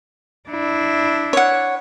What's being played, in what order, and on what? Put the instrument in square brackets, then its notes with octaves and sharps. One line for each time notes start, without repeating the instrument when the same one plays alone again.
[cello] D4 E4
[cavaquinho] C#5 F#5